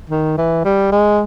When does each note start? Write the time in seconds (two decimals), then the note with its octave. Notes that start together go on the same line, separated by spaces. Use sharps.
0.10 D#3
0.38 E3
0.65 G3
0.92 G#3